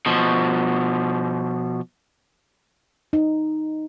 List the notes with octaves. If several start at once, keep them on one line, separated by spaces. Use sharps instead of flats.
B2 F3
D#4